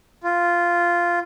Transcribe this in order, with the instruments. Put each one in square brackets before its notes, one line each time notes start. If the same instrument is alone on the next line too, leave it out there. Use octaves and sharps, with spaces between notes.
[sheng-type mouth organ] F4